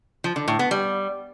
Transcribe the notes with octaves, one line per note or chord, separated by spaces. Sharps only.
F3
D3
A2
B3
G3